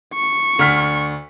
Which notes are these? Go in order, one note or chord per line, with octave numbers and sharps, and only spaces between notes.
C#6
D2 F6 B6